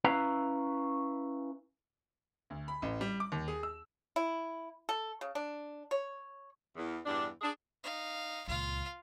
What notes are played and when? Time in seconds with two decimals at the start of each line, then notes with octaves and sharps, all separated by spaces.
0.04 C#4 E4 B4 F5 A#5
2.50 D2
2.68 B5
2.82 A1
3.01 G3
3.20 D6
3.32 D#2
3.48 G#4
3.63 E6
4.16 E4
4.89 A4
5.21 C#3
5.35 D4
5.91 C#5
6.76 E2
7.06 E2 G2 D4
7.42 D4 G#4
7.84 D#4 F5
8.48 C#2 A#2 F4 F5